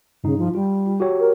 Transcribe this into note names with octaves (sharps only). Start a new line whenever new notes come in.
G2 C#3 D#4
F3
G3 F4
F#4 G4 C#5
A#4